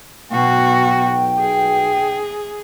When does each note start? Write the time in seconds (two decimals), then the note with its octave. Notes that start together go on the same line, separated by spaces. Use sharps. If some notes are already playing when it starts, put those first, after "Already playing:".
0.31 B1 B2 F#4 G5
1.40 G#4